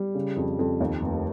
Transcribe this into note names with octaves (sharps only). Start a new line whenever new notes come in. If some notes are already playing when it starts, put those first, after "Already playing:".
Already playing: G3
C#3
F2
F2
D#2
F1